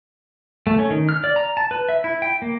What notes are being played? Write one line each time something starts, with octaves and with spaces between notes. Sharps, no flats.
A3
C#4
D#3
F6
D5
A#5
A5
B4
E5
E4
G5
A#3